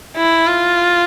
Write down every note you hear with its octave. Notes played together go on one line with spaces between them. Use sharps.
E4
F4